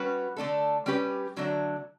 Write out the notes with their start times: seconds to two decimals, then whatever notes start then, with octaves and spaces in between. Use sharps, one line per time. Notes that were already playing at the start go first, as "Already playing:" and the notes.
Already playing: G3 C#4 F#4 B4
0.36 D3 A3 D4 A4
0.86 G3 C#4 G4 B4
1.36 D3 F#3 A3 D4